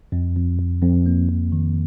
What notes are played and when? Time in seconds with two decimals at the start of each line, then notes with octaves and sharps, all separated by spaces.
0.12 F2
0.36 F2
0.59 F2
0.82 F2
1.06 A#3
1.29 F2
1.52 D#3